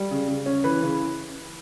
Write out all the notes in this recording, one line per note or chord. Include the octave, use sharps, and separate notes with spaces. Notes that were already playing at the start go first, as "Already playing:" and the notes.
Already playing: G3
C#3
C#3
C#4
E3 B4
C#3